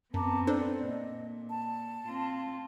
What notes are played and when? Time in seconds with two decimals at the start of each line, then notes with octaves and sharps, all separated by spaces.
0.14 F#2 B3 C4 A5 A#5 D6
0.47 D4 A4 C5 D5
0.85 A#2 D#5
1.49 A5
2.06 C4 F4